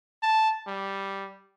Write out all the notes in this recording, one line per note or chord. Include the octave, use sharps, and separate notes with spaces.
A5
G3